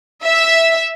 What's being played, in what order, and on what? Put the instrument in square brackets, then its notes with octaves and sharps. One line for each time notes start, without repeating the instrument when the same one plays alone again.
[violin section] E5